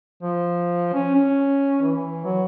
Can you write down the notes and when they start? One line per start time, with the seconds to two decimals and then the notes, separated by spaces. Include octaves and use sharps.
0.23 F3
0.94 C#4
1.14 C#4
1.82 E3
2.25 F#3